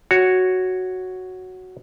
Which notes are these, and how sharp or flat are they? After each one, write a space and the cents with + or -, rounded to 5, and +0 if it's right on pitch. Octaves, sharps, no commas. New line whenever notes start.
F#4 +0 C#5 +0